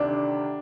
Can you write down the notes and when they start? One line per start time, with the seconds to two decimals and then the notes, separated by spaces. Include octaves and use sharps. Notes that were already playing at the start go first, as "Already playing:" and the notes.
Already playing: D2 C3 D#3 D4